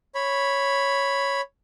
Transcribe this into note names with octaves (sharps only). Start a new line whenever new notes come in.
C#5 B5